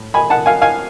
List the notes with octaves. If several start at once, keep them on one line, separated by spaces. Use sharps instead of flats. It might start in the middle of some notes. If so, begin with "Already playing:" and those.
Already playing: A2
G#5 B5
F#5 A5
F5 G#5
F5 G#5